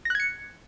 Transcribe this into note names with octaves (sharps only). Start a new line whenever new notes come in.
F#6 G#6 A#6 C#7